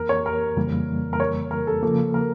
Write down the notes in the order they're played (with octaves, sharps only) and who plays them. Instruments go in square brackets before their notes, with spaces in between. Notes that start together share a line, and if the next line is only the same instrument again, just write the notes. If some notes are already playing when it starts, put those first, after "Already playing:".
Already playing: [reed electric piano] F2 E3 A#3 [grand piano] A#4
[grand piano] C#5
A#4
[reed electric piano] F2 C#3 E3 G3 A#3
[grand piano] A#4
C#5
A#4
A4
[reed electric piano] C#3 F3 A#3 [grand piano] A4
[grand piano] A#4